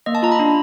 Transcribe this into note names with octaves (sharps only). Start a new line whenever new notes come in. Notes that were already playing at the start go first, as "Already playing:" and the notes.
A#3 D#5
A5
F4 A#5
B5
D4